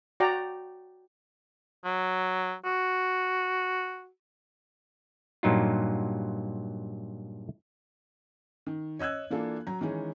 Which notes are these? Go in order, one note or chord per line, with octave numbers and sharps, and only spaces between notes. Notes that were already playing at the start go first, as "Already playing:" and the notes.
F#4 D5 G5 A#5
F#3
F#4
G2 A#2 F#3 D#4 F4
D#3
C#5 D#5 E6 F#6 G#6
E3 A#3 D4 F4 A4
F#3 A#5
D#3 E3 G#3 C#4 D#4